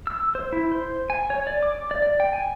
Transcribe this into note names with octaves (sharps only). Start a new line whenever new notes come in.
E6
C5
E4
C5
G#5
C#5
D5
D6
D5
D5
G5
G#5